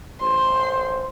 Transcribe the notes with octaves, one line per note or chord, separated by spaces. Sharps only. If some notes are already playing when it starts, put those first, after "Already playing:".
A1 C5 C6